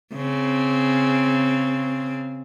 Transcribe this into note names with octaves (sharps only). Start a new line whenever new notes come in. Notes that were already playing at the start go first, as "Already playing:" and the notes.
C#3 C4